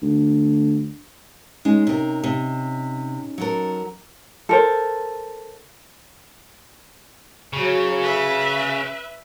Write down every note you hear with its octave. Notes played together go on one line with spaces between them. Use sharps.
D2
G#3 C#4 D#4
C3 A#4
C3
F#3 A4 A#4
A4 A#4 C5
C#3 F#3 F#4
B4 E5